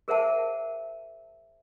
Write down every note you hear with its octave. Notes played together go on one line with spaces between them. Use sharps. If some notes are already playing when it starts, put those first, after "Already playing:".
G#4 A#4 C5 E5 F#5 A5